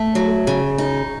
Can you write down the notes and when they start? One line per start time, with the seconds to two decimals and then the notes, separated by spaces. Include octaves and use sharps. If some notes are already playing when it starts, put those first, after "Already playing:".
Already playing: A3
0.15 F#3
0.47 C#3
0.78 D#4